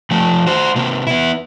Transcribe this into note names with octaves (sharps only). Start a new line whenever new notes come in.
F3 A3
F#4 C5
C3 A#3
B3 E4